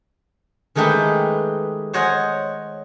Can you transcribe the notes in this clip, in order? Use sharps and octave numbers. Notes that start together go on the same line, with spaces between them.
D#3 G#3 A3 D#4 G4 B4
C5 C#5 D#5 F#5 G#5